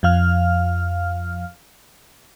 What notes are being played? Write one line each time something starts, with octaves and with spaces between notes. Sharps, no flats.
F2 F3 F5 F6